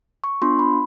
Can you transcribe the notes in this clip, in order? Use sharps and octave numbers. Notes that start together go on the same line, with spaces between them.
C#6
B3 D4 F4 C6
B5